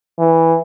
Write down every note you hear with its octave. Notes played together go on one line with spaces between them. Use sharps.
E3